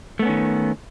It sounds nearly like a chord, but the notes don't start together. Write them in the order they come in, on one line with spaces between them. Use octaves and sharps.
A3 B3 C#4 D#3